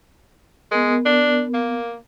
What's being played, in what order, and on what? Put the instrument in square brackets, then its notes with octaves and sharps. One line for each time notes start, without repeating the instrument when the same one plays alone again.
[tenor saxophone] G#3 [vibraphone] B3 A#4
[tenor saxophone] D4
A#3